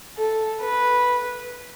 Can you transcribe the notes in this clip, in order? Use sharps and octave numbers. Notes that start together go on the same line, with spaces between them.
A4
B4